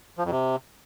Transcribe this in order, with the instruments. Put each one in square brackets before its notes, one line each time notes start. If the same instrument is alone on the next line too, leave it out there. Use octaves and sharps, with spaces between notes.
[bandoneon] F3
F2
C3